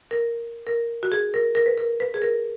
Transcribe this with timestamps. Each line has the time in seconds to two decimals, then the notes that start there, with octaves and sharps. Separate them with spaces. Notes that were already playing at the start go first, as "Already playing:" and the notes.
0.11 A#4
0.67 A#4
1.03 F#4
1.12 G#4
1.34 A#4
1.55 A#4
1.66 B4
1.77 A#4
2.00 B4
2.14 G#4
2.22 A#4